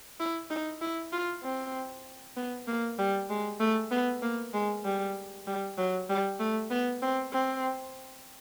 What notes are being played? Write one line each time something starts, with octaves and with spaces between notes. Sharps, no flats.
E4
D#4
E4
F4
C4
B3
A#3
G3
G#3
A3
B3
A#3
G#3
G3
G3
F#3
G3
A3
B3
C4
C4